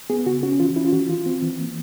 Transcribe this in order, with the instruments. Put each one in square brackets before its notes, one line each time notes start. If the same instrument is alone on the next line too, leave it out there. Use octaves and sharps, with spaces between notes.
[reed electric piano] B3 G#4
C#3 F#4
C#4 F#4
E3 F4
C#4 E4
F4
E3 F#4
E3 F4
C4
E3
A#3